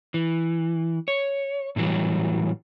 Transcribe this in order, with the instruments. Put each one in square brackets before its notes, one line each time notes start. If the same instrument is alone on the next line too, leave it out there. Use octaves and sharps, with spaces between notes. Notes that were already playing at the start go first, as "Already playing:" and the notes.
[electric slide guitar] E3
C#5
A2 D3 E3 F#3 G3